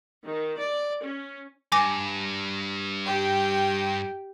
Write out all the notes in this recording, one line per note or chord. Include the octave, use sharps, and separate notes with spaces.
D#3
D5
C#4
G2 G#5 D6 A#6
G4 G5